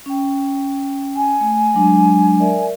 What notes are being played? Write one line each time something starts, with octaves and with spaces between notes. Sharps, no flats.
C#4 G5
G#5
A3
F#3 G#3 D4
A#4 D5 E5